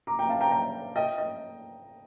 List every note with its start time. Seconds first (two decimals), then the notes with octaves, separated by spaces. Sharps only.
0.07 A#5 D6
0.19 G5 A#5
0.29 F5 A5
0.41 G5 A#5
0.51 G5 A#5
0.96 D#5 G5
1.18 D#5